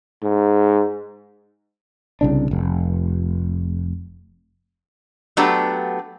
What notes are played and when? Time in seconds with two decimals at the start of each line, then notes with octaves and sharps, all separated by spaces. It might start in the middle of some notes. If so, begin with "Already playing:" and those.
0.23 G#2
2.21 C2 C#3 D4
2.51 F1
5.37 F#3 A3 B3 D4 G4